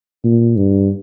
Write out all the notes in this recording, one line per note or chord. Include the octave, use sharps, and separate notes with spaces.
A#2
G2